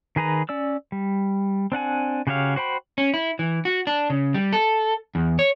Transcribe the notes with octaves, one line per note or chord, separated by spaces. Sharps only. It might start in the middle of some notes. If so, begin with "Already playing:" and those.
D#3 G#4 B4 A#5
C#4 D5 E6
G3
C4 D4 F#5 G#5
C#3 F#4 G4 C#5 F5
F#4 C5 G5 B5
C#4
E4
E3
F#4
D4
C#3
G3
A4
E2
C#5